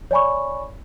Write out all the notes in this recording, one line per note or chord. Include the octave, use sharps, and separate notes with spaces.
C#5 D5 G#5 B5 C#6